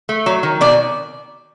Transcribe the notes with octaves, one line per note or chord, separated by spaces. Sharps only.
A3
F#3
D#3
B2 D5